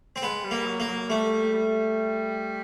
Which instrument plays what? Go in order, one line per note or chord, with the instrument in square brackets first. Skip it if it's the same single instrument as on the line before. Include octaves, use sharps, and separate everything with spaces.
[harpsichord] C4
[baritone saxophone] G#3 [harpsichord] B3
[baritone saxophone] G3
[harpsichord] A#3
[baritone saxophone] F#3
[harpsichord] A#3
[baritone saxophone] F#3
[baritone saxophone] G3 [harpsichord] A3
[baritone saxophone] G3